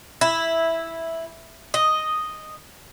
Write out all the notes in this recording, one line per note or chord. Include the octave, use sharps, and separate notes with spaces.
E4
D#5